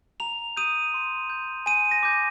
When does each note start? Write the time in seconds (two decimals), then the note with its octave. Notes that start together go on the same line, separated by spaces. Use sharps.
0.20 A#5 F7
0.57 D#6 G6 D#7
0.94 C6
1.30 G6
1.66 G#5 D#7
1.91 A#6
2.03 D6 G6